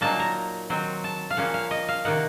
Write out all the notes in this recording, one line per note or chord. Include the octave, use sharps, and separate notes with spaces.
A#2 F#3 A#3 D#4 A5
A#5
D#3 F#3 C4
A5
F5
A#2 F3 A#3 C#4 F#5
F5
D#5
F5
C3 D#3 A#3 D#4 F#5